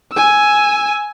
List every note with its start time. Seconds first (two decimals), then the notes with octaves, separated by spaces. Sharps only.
0.13 G#5 E6